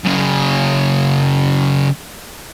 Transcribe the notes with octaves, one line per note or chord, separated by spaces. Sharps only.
F#2 C#3